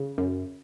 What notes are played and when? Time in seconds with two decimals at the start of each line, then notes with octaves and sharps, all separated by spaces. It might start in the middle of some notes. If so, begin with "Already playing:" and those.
Already playing: C#3
0.18 F#2